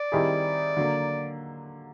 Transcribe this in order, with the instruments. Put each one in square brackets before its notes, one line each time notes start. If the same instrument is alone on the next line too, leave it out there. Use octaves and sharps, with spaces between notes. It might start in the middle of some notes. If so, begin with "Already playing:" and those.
Already playing: [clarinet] D5
[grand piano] D#3 G3 C4 E4 G#4
D3 F#3 A#3